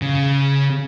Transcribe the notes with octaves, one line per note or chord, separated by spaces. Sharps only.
C#3